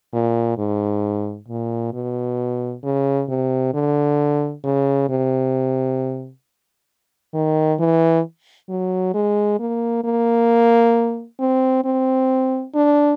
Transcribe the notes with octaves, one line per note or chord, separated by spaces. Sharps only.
A#2
G#2
A#2
B2
C#3
C3
D3
C#3
C3
D#3
E3
F#3
G#3
A#3
A#3
C4
C4
D4